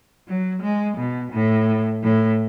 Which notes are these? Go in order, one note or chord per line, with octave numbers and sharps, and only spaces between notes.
F#3
G#3
B2
A2
A2